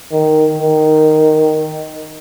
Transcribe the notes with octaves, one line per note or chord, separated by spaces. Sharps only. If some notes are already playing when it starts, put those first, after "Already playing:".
D#3
D#3